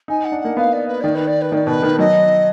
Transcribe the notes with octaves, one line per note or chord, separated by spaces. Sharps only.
D#4 G#5
F#5
D4
A#3 F#5
B3 F5
D5
B4
D#3 D5
B4
D5
B4
D#3 D5
B2 B4
D#3
F#3 D#5